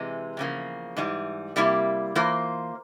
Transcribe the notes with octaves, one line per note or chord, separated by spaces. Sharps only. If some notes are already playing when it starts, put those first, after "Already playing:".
Already playing: C3 E3 G#3
E2 C#3 F3 A#3
G#2 E3 G3
C3 G3 A#3 E4
E3 A#3 F4 C5